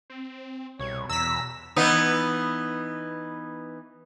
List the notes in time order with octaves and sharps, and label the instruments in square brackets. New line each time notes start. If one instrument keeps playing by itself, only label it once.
[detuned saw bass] C4
[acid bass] C2 [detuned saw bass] B2 [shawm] C#5
[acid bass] E2 [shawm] A#5 [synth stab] E6 B6
[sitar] E3 B3 D#4